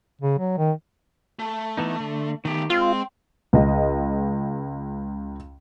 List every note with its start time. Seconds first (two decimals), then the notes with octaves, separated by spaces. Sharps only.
0.21 C#3
0.39 F#3
0.58 D#3
1.39 A3
1.77 E3 B3 D#4
2.00 D3
2.45 D#3 A3 B3 G4
2.70 G#3 C4 F4 G5 C6
3.53 C#2 D#5